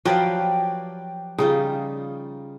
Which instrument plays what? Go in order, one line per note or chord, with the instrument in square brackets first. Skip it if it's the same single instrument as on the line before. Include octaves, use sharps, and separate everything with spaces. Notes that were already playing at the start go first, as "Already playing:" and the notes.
[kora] F3 [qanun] F#3 D5 F5 [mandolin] G4 B4
[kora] C#3 [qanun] G3 D#4 F4